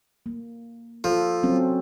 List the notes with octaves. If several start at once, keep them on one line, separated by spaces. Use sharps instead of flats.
A#3
F3 A4
F#3 C4 C#4